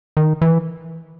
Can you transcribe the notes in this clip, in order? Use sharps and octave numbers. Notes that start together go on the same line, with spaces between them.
D#3
E3